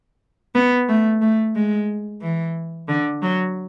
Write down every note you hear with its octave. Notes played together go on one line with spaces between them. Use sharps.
B3
A3
A3
G#3
E3
D3
F#3